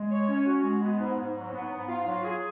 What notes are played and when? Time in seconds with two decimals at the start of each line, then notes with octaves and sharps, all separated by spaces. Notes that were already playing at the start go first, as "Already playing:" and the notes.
Already playing: G#3
0.10 C#5
0.27 C#4
0.46 F#4
0.63 G#3
0.81 B3
0.99 G#2
1.17 G#2
1.35 F#3
1.53 B3
1.71 G#2
1.89 F4
2.07 F#3
2.24 G#4